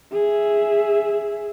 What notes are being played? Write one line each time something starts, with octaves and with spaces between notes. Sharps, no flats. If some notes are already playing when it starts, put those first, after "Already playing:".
G#4 E5